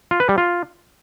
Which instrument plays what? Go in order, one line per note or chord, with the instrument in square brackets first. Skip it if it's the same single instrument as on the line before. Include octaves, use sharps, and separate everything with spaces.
[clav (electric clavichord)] F4
B4
G3
F4